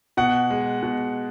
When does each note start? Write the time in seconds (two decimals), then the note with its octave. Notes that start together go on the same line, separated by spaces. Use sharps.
0.17 B2 F#5
0.50 G#3
0.83 B2